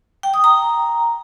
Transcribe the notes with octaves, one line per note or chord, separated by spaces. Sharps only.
G5
D#6
A#5